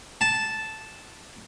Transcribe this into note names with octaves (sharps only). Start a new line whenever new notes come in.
A5